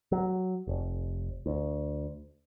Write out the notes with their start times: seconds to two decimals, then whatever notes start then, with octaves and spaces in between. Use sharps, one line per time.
0.12 F#3
0.67 F1
1.46 D2